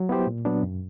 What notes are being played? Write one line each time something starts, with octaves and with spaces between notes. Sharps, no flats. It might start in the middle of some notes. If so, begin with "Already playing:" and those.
Already playing: F#3
B3 E4 G4 C5
A#2
F#3 B3 D4
F#2